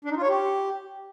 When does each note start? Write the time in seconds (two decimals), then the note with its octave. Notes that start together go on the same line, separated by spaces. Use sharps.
0.05 D4
0.11 D#4
0.16 F4
0.22 C#5
0.28 G4